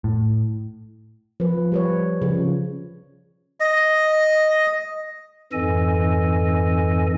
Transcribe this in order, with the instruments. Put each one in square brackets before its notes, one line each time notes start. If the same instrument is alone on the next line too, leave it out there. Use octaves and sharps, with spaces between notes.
[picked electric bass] A2
[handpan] F3 B4
G3 B4 C#5
C#3 F3
[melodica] D#5
[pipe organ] F2 G#2 E3 A4 D#5 G#5